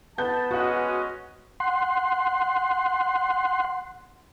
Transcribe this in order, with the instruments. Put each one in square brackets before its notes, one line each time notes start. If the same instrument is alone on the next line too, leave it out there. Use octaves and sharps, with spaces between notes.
[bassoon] B3 [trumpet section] A5 [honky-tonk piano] G6
[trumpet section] G#3 C#4 D#5 [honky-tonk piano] F#4 F#5
[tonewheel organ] F#5 C6